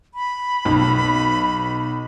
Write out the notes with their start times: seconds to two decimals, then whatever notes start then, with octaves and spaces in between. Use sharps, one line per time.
0.14 B5
0.65 B1